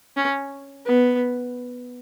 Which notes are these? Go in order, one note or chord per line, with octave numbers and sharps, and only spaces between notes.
C#4
B3